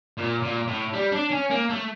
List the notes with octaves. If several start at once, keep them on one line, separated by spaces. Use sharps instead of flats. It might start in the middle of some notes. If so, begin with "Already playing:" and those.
A#2
A#2
A2
G3
D4
C#4
A#3
A3